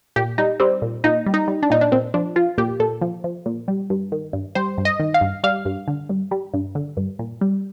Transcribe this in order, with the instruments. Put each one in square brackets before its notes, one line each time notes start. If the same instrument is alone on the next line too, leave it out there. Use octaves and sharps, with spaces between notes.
[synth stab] A#2 G4
G3 D#4
G3 C4
A#2
A#2 D#4
G3
D#4
G3
D4
A#2 D#4
D4
A#2 C4
F3 D4
F3 F4
A#2 G4
A#2 A4
F3
F3
A#2
G3
G2
D#3
G2
G3 C5
G2
D#5
D#3
F5
G2
G3 F5
G2
D3
G2
G3
G2
D3
G2
A#2
G3